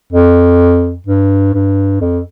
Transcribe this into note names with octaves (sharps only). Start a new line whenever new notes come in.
F2
G2
G2
F2